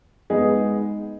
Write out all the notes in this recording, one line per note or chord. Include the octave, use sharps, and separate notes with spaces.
G#3 B3 D#4 G#4